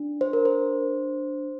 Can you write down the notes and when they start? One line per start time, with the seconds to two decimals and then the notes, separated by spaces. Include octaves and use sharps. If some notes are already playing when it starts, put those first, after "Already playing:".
Already playing: D4
0.21 C5
0.33 A#4
0.45 C5